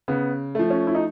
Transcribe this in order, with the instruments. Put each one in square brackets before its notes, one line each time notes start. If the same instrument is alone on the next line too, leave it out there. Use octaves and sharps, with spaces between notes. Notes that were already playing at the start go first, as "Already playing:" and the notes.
[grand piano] C#3 [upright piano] B3
[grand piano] F3 A3
[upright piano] C#4
E4
D#4